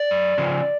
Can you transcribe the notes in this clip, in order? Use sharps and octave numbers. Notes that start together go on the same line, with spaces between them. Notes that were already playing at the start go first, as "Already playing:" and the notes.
Already playing: D5
F#2
C#3 F3